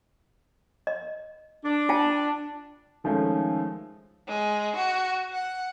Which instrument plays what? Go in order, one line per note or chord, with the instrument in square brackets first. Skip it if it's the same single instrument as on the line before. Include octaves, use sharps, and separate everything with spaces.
[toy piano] D#5
[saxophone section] D4
[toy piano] F4 G5 A5
[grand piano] D#3 F3 G#3 A3 C#4
[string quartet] G#3
F#4
F#5